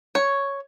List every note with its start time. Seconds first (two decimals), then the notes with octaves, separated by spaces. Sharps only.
0.15 C#5